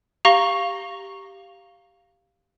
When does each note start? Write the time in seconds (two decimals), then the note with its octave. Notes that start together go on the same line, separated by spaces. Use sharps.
0.25 G4 F5 A#5 C#6 A#6 G7